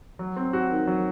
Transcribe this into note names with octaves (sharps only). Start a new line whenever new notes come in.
F#3
C4
F#4
D#3
F#3